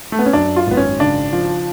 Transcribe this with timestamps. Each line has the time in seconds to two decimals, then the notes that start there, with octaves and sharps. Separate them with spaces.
0.12 A3
0.19 B3
0.26 C#4
0.33 F#2 D4
0.56 F4
0.67 G#1 B3
0.77 C#4
0.99 C#3 D4
1.33 F3